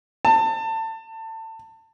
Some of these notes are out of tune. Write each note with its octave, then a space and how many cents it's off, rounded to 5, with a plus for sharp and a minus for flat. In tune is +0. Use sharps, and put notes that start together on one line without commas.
A5 +25